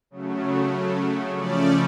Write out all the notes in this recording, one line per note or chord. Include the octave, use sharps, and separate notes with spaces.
C#3 F#3 A3
C#3 F3 A3 C#4 D5